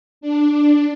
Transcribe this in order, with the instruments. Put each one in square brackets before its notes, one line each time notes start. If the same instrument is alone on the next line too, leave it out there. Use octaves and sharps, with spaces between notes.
[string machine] D4